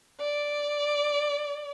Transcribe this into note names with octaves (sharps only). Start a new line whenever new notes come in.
D5